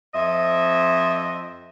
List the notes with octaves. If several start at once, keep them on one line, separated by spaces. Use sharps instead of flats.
F2 C5 D#5 E5